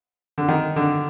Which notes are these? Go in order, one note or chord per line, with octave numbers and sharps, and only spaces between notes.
D3
D#3
D3